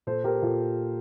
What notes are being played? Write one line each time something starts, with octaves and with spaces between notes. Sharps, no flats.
A#2 A4 C5
G4 A#4
A#2 F4 A4